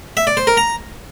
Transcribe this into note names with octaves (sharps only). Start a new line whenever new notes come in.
E5
D5
C5
A#4
A#5